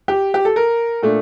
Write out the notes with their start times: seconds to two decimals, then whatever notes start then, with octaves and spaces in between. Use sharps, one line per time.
0.08 G4
0.34 G4
0.45 A4
0.56 A#4
1.02 A#2 A3 D4